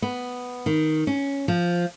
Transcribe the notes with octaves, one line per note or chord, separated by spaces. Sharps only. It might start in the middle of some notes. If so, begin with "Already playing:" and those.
B3
D#3
C#4
F3